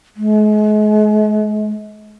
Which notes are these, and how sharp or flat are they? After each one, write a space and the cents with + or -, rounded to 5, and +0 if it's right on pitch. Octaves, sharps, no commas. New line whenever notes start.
G#3 +40